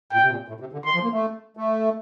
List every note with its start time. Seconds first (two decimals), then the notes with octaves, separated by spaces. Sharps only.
0.12 A#2 G5
0.23 C3
0.30 A#2
0.48 A2
0.60 C3
0.73 D3
0.85 D#3 C6
0.94 F3
1.03 A#3
1.12 A3
1.57 A3